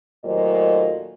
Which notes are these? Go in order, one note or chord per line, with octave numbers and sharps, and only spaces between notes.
D#2 A#2 F#3 A3 C5 D#5